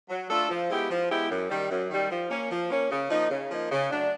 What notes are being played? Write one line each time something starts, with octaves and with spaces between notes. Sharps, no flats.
F#3
A3 D4 F4 A4
F3
G#3 B3 E4 G4
F3
G#3 B3 E4 G4
F#2
D#3 G3
F#2
D#3 G3
F3
A#3 C#4
F3
A#3 C#4
C#3
F3 A#3 D#4
C#3
F3 A#3 D#4
C#3
F#3 A3 D4